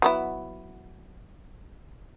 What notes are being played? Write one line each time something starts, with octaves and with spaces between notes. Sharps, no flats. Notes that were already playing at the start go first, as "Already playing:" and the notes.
F#3 B3 E4